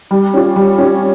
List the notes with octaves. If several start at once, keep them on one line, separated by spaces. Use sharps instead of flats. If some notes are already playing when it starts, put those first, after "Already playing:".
G3
C#4 F4
G3
C#4 F4